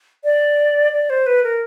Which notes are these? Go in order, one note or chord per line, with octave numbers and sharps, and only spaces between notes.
D5
D5
C5
B4
A#4